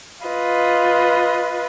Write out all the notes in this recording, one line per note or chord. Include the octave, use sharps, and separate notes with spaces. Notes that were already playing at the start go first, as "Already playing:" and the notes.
F4 B4 D#5